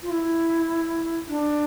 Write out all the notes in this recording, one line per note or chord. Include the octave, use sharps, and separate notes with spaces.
F4
E4
D4